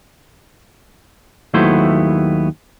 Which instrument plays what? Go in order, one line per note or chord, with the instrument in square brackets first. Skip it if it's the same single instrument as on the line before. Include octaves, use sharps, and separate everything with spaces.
[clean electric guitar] D#2 F#3 A3 B3 E4 C5